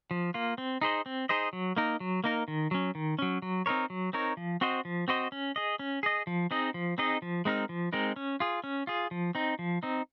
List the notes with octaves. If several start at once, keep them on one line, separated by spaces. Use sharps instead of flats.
F3
A#3 F4
C4
D#4 G#4 C5 D#5
C4
D#4 G#4 C5 D#5
F#3
A#3 D#4 A#4
F#3
A#3 D#4 A#4
D#3
F#3 C#4
D#3
F#3 C#4
F#3
C4 D#4 A#4 C#5
F#3
C4 D#4 A#4 C#5
F3
C4 F#4 C5 D#5
F3
C4 F#4 C5 D#5
C#4
G#4 D#5
C#4
G#4 D#5
F3
C4 D#4 G#4 D#5
F3
C4 D#4 G#4 D#5
F3
G#3 C4 D#4 A#4
F3
G#3 C4 D#4 A#4
C#4
F4 G#4
C#4
F4 G#4
F3
C4 D#4
F3
C4 D#4